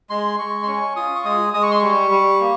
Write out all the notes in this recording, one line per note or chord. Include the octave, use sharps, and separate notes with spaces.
G#3 C6
G#3 C#6
C6
C#4 C#6
F4 D#6
C#6
G#3 D#6
G#3 D#6
C#6
C6
G3 C#6
G3
A#3